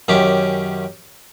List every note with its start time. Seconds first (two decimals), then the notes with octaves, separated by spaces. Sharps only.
0.08 F#2 D#3 C#4 G4 D6